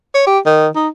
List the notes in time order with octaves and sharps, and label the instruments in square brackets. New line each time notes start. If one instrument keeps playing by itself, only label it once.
[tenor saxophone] C#5
G4
D#3
D#4